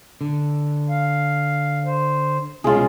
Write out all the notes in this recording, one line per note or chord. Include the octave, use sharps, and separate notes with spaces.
D3
F5
C5
C2 B2 G#3 C#4 F4 G#4